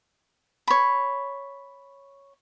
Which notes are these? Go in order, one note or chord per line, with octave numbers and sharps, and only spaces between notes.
C#5 B5